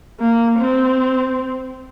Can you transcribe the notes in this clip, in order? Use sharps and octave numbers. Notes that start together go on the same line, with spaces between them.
A#3
C4